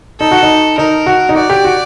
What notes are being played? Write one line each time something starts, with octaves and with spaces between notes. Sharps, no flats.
D#4 A4
F#4
D#4
D#4 A#4
F#4
D#4
F#4 D5
G4
F#4